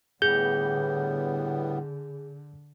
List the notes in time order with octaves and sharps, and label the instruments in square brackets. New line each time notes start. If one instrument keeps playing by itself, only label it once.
[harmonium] A2 G3 B3 [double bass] D3 [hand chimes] G#4 [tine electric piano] G6